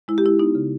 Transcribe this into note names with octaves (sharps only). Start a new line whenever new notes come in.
G#3 E4
G4
G#3 E4
B3 D#4
C#3